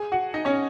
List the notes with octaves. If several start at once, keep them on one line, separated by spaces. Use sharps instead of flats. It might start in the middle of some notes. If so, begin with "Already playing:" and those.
Already playing: G#4 G#5
F#4 F#5
D#4 D#5
C#4 C#5